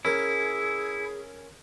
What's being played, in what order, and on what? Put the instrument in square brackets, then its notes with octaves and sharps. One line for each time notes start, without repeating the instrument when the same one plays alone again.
[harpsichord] C#4 A#4 [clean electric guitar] E4 [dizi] G#4